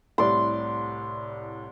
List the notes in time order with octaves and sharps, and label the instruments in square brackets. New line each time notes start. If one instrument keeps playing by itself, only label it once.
[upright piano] C2 A2 C3 [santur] D5 C6